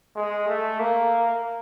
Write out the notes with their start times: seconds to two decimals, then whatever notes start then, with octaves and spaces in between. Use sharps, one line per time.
0.16 G#3
0.48 A3
0.79 A#3